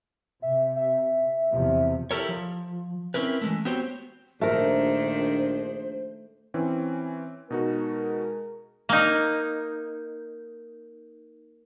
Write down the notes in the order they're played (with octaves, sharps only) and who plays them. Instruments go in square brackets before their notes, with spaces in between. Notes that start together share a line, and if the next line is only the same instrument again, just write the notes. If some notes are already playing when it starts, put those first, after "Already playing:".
[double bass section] C3 [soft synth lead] E5
[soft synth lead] E5
[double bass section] E2 C3 F3
[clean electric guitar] E4 G4 A4 A#4 C#5
F3
C4 C#4 D#4 E4 A#4 B4
E3 G#3 A3
B3 C4 F#4 G4 C5 C#5
[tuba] A#1 [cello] D#3 D4 [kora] A3 A#4 [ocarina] C5
[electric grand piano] E3 C4 C#4
[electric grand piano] B2 D#4 F#4 [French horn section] G#3 A#4
[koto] A#3 D#4